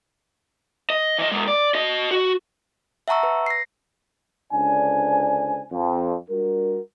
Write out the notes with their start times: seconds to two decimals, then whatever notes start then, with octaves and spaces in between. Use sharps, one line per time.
0.90 D#5
1.19 E3 D#5
1.32 B2 G#3
1.48 D5
1.75 F#4 D#5
2.11 F#4
3.08 E5 F#5 A5 A#5 C#6 E6
3.23 B4
3.46 A#6 C7
4.53 C#2 D3 D4 C5 D5 G#5
5.71 F2
6.30 G3 D4 F#4 A#4